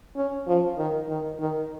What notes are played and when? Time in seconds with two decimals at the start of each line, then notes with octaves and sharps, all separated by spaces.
0.17 C#4
0.47 F3
0.78 D#3
1.09 D#3
1.40 D#3